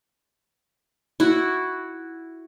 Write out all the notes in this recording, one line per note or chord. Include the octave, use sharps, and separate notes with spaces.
E4 F#4